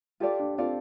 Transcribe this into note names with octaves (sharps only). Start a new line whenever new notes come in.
F4 G4 A4 D5 F5
D4
C4 F4 A4 D5 F5